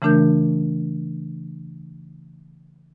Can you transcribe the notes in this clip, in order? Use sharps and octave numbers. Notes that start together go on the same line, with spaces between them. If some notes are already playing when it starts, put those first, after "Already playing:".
C#3 E3 A3 D4 A#4 G6